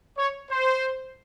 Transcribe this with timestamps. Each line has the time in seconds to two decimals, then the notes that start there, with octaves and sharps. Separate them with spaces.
0.17 C#5
0.49 C5